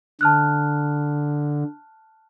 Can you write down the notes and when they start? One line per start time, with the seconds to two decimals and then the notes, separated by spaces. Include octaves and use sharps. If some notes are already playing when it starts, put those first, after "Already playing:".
0.21 D3 A5 F6 F#6